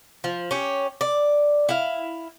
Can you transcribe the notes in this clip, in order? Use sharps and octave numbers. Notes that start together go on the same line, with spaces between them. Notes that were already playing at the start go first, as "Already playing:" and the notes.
F3
C#4 G4
D5
E4 F5